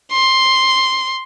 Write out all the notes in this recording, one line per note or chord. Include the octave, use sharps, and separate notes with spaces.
C6